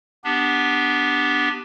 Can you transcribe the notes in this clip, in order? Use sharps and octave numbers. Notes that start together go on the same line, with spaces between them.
B3 D4 G4